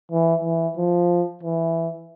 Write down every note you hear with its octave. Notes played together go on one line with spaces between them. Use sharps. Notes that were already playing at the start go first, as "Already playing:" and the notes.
E3
E3
F3
E3